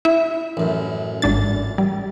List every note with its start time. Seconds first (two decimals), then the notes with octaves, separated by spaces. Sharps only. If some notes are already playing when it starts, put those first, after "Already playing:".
0.05 E4 E5
0.57 A1 F#2
1.22 G#1 D4 A6
1.78 G3